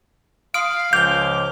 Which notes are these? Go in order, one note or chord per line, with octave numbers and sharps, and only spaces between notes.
F5 C6 D#6 F6 D7
C#2 F3 D6 G6 F7 G7